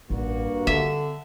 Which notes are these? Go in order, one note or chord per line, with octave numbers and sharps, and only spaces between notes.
A1 G2 A#3 F#4
D3 C4 E5